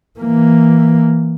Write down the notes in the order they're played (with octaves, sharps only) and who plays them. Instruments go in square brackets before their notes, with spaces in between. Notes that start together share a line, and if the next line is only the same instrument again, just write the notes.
[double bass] E3 A#3